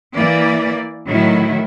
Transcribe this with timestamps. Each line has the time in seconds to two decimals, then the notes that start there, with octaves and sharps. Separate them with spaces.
0.17 E3 A#3 D5
1.08 A2 D#3 F#3 E4